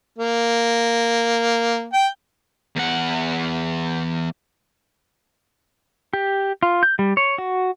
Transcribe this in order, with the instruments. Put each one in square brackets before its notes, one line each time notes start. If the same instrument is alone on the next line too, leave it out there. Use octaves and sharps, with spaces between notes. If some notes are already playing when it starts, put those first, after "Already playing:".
[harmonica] A#3
G5
[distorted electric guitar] E2 F#5
[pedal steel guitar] G4
F4
G6
G3
C#5
F#4